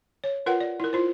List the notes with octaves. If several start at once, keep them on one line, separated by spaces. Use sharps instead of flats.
C#5
F4 A#4 B4 F#5 G5
D5
E4 A#4
E4 F4 C5